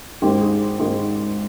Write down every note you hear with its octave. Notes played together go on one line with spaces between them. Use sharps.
G#1 G#2 D#3 G4
G#4
G#1 G#2 D#3 G#4